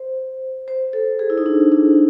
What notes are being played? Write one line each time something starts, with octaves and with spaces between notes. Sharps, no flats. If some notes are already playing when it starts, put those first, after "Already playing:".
Already playing: C5
C5
A4
G#4
E4
D#4
D4
D4